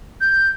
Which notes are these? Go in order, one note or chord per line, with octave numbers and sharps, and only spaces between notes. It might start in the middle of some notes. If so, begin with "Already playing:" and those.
G6